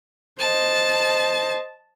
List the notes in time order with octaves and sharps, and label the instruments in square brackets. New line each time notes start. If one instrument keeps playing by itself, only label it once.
[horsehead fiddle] C5 D#5 [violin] A5